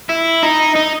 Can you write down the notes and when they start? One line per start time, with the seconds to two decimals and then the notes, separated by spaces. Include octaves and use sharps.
0.09 E4
0.43 D#4
0.76 D#4